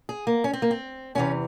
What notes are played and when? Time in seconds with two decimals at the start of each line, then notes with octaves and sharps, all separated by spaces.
0.09 G#4
0.27 A#3
0.44 C#4
0.53 C4
0.62 A#3
0.71 C4
1.15 E2 C3 E3 C#4